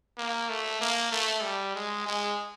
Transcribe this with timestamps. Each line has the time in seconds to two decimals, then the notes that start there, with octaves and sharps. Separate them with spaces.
0.18 A#3
0.49 A3
0.81 A#3
1.12 A3
1.43 G3
1.75 G#3
2.06 G#3